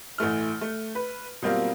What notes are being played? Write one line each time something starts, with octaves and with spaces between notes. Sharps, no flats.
A1 E3 A3 F6
A3
B4
B2 F#3 G3 A#3 C4 F4